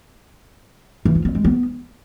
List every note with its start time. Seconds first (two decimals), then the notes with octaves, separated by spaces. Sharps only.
1.05 E3
1.15 F4
1.25 C4
1.35 G#3
1.45 B3